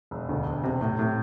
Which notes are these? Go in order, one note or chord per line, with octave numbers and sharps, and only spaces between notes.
E1
D2
E1
C3
A2
A2